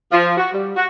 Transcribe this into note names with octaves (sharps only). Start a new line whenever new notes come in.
F3
F#4
G3
F#4